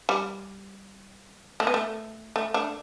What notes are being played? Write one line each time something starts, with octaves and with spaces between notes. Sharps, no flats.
G3
A3
B3
A3
A3
A3 D4